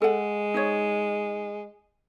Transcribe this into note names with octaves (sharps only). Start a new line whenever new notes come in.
G#3 A4 F#5
D#4 C5 C#5